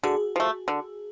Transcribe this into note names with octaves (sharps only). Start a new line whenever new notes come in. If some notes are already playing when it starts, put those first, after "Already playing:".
D3 F#4 G#4
F3 A3
D3